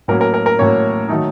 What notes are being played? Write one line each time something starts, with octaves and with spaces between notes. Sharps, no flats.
A2 F#3 A#3 C#4 A#4
A#4
A#4
A#4
A2 F#3 A#3 C#4 C#5
D#3 F#3 A3 D#4